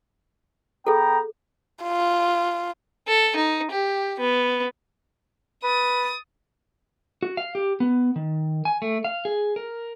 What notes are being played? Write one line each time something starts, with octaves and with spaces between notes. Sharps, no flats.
B3 G#4 A4 G5 A#5
F4
A4
D#4
G4
B3
B4 D#6 A6
F#4
F5
G4
B3
D#3
G#5
A3
F5
G#4
A#4